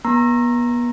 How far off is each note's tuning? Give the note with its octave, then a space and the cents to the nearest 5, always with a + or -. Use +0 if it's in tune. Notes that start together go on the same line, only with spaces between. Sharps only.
B3 -35 A#5 +0